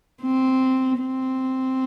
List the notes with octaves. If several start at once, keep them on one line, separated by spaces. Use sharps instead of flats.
C4
C4